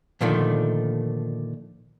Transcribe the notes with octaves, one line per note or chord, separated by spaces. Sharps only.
A#2 D3 D#3 F3 A3